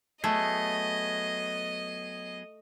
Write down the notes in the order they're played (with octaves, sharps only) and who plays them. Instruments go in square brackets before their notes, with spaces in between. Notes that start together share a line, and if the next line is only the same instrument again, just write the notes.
[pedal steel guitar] F#3 B3 G#4 [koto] A3 [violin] D#5